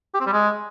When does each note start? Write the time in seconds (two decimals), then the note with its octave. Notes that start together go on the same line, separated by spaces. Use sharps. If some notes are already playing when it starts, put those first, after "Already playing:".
0.14 G4
0.20 C4
0.26 G3
0.32 G#3